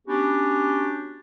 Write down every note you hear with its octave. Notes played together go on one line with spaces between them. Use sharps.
B3 C#4 D4 F#4 G4